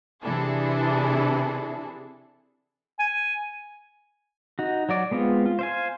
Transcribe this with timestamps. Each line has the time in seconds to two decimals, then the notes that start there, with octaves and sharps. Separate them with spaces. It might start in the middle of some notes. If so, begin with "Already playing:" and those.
0.23 C3 E3 D4 E4 G#4 A4
2.99 G#5
4.59 D#4 F#4
4.89 F#3 F#4 D5
5.11 G#3 B3 C4 F4
5.46 F4
5.59 C5 F5 G#5